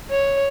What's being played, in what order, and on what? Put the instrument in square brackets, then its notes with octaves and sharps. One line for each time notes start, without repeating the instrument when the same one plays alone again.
[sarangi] C#5